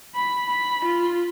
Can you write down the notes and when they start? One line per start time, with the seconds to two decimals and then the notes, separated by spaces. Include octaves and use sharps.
0.15 B5
0.48 B5
0.85 F4